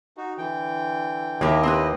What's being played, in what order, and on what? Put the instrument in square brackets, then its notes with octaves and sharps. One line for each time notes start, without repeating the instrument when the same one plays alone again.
[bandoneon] D#4 F#4
D3 E3 G5
[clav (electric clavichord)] D#2 [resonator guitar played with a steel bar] A#3 G4 E5 [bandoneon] E4 D#5
[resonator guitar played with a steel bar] C4 G4 B4